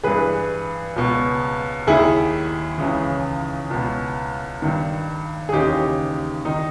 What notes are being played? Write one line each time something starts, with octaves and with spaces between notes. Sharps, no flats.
G2 E3 G#4 B4
C#2 B2
D#2 D#3 E4 G#4
C#2 C#3 E3
C#2 B2
G2 D#3
G#4
D#2 C#3 E3 D#4 G4
D#3 D#4